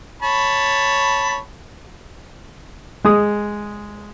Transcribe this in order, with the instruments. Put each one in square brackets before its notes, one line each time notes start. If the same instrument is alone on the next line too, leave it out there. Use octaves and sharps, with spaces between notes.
[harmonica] C#5 A5 B5
[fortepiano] G#3 D#6